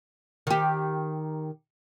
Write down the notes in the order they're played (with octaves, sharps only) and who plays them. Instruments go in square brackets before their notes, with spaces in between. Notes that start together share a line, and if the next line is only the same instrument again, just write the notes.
[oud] D#3 G4